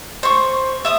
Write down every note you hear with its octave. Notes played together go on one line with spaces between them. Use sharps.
C5 C#6
E5 D#6